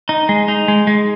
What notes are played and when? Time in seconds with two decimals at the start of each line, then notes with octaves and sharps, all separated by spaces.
0.09 D#4
0.29 G#3
0.48 D#4
0.68 G#3
0.87 G#3